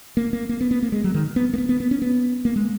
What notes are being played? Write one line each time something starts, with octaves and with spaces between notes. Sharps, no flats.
A#3
A#3
A#3
B3
B3
A#3
G#3
F#3
D#3
B3
A#3
B3
B3
B3
C#4
B3
A#3
G#3